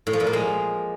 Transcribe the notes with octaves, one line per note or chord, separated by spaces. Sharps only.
A2
F3
A#2
A#3
G#3